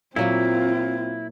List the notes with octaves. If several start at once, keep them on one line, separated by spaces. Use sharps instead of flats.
A#2 F#3 A#3 C4 E4 F4